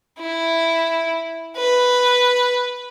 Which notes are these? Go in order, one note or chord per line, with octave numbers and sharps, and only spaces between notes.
E4
B4